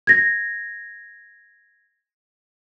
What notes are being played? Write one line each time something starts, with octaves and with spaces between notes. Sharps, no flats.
G#6 A#6